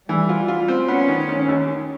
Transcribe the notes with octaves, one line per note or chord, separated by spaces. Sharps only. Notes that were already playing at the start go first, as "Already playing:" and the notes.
E3 G3
F4
F4
C4
B3 C#4
D#3
D#3
D#2
D#3